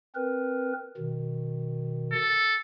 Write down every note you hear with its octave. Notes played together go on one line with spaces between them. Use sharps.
C4 A#4 B4
B2 D#3
A4